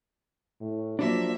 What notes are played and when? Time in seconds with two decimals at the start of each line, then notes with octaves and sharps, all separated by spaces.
0.61 A2
0.99 F3 F#3 A#3 D4 E5